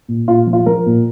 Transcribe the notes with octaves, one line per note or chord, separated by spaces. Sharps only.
A#2
A#2 F4
F3
F4
F3 A#4
A#2